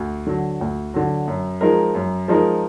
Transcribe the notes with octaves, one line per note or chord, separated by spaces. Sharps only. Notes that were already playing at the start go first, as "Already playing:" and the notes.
Already playing: D2
D3 F#3
D2
D3 F#3
F#2
F3 G#3 D#4 A#4
F#2
F3 G#3 D#4 A#4